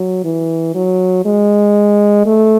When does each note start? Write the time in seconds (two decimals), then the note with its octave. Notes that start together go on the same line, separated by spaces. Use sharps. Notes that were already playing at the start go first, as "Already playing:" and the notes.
Already playing: F#3
0.24 E3
0.75 F#3
1.25 G#3
2.26 A3